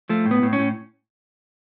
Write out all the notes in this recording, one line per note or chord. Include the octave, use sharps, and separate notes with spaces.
F3 A3
A2
B3
A2
C#4
A2